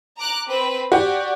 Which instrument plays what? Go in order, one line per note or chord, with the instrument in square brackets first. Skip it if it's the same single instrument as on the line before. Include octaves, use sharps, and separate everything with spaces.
[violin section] A#5 D6 F#6
C4 B4
[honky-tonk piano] F#4 G4 [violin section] D5